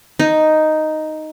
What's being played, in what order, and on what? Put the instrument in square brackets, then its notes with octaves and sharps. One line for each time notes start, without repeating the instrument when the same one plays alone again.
[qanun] D#4